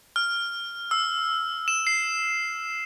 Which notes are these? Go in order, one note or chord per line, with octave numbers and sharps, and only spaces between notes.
F6
E6
E7
C7